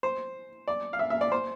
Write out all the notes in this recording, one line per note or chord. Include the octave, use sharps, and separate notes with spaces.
C5
D5
F5
E5
E5
D5
C5